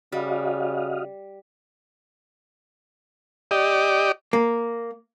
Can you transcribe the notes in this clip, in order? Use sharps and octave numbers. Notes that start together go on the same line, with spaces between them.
C#3 G3 F#4 D#5 F5
G4 D5 D#5
A#3